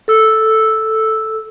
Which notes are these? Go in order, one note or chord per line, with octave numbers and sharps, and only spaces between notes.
A4 E6